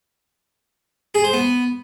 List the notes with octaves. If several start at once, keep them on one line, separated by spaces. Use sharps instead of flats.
G#4
C5
B3